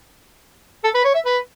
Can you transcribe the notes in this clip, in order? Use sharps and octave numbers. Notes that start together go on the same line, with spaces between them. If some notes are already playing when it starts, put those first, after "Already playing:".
A4
B4
C#5
E5
B4